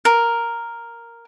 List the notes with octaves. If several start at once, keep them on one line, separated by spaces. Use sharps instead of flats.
A#4